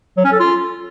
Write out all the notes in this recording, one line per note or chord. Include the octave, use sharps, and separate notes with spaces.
F#3
C#4
A4
F4